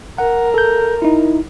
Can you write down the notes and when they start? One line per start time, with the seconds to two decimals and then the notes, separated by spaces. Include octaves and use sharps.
0.18 A#4 F#5
0.54 A4 G6
1.02 D#4 E4